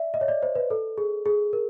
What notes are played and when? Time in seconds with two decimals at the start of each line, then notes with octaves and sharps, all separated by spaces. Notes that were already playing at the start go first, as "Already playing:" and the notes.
Already playing: D5 E5
0.14 D#5
0.21 C#5
0.28 D5
0.42 C5
0.55 B4
0.70 A4
0.98 G#4
1.26 G#4
1.53 A#4